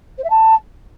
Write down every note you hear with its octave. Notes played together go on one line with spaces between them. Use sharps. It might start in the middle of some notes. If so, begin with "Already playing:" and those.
C5
E5
A5